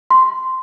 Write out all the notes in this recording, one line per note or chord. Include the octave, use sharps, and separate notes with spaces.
C6